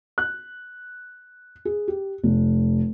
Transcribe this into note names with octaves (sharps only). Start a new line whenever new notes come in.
F#6
G#4
G4
F1